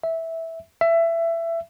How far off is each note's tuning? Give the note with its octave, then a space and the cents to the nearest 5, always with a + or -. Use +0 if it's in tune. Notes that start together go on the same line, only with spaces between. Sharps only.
E5 -10
E5 +20